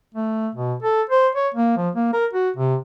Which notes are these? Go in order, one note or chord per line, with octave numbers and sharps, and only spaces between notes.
A3
B2
A4
C5
C#5
A#3
F3
A#3
A#4
F#4
C3